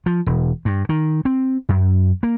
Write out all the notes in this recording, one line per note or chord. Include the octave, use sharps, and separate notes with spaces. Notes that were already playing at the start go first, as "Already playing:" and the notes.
F3
E1
G2
D#3
C4
F#2
A#3